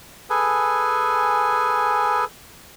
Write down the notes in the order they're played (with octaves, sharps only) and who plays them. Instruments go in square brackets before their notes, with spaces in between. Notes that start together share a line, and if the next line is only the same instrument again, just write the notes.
[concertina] G#4 A4 B4 G#5